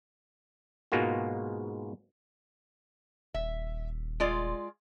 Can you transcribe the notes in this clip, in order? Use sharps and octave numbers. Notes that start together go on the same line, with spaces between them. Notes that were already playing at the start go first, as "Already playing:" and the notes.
G#2 B2 G#3 A#3 F4 F#4
D#1 E5
G#3 F4 D5